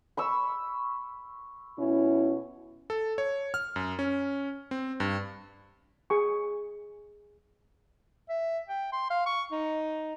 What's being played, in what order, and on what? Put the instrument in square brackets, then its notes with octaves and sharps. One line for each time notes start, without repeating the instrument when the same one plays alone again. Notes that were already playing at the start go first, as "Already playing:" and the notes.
[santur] B5 C#6 E6
[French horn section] B2 C#4 E4
[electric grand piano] A4
C#5
F6
F#2
C#4
C4
G2
[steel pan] G#4 G#5 C#6
[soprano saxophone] E5
G5
C6
F5
C#6
D#4